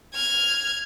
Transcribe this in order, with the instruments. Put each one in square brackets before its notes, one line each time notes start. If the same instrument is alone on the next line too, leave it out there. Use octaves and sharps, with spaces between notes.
[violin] F6 G#6